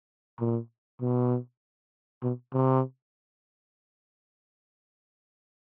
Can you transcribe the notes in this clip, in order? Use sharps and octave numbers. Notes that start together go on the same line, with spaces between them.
A#2
B2
B2
C3